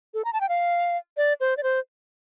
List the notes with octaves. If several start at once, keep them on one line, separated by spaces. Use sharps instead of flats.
A4
A#5
A5
G5
F5
D5
C5
D5
C5